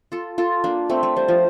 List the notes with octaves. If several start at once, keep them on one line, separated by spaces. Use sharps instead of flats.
F4 A4
F4 A4
A#3 D4
A3 C4
A3
G3 C5
F3